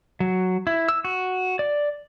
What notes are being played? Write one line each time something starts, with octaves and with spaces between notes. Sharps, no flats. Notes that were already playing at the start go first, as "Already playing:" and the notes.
F#3
E4
E6
F#4
D5